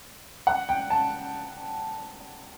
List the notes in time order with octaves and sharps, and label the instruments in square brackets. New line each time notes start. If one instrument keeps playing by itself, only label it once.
[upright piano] F#5
G5
A5